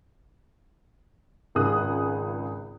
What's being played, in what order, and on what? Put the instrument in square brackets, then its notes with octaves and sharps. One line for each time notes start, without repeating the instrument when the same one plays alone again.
[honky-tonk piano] G#1 C#2 G#4 D#6 F#6